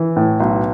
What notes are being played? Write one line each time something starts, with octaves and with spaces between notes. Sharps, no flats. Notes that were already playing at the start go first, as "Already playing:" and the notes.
Already playing: E3
A2
B1